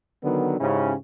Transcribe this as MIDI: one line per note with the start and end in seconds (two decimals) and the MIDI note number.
0.23 0.56 50
0.23 0.56 51
0.23 0.56 54
0.23 0.56 59
0.60 0.94 44
0.60 0.94 49
0.60 0.94 61
0.60 0.94 64
0.60 0.94 67